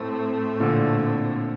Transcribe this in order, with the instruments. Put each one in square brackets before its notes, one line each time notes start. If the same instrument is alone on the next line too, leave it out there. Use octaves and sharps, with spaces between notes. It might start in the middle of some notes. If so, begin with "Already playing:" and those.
Already playing: [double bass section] A2 A3 C4
[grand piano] A#2 D3